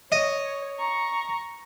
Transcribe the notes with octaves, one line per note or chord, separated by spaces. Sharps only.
C#5 D#5
A#5 C#6